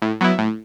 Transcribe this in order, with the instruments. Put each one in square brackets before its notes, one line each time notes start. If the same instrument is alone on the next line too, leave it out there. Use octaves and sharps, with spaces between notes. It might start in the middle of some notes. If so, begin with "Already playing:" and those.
[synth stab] A2
F#3 B3 E4
A2